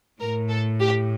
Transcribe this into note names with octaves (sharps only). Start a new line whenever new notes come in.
A2 A#4
A4
G4